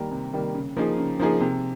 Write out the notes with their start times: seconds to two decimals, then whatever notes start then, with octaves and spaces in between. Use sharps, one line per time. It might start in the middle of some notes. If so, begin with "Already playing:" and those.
Already playing: D#3 G3 A#3
0.11 C3
0.33 D#3 G3 A#3
0.55 C#3
0.77 F3 A#3 D#4 G#4
0.98 C#3
1.19 F3 A#3 D#4 G#4
1.41 C3